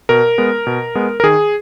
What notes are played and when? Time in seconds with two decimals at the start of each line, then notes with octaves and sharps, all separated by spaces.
0.09 B2 A#4
0.38 G#3 B3
0.67 B2
0.95 G#3 B3
1.20 A#4
1.23 D#3 G#4